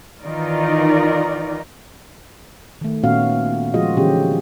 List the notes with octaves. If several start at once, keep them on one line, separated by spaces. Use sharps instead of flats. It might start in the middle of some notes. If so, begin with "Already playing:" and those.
D#3 E3 D#4 F4 A#4 D5
D#3 A3
A#2 D#3 B3 C#4 F#4 F5
F3 G#3 F4 F#4 G#4 D#5
D3 E3 F#3 C#4 G4 G#4